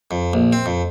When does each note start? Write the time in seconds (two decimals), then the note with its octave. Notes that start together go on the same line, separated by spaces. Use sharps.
0.11 F2
0.33 A#1
0.53 C4
0.66 F2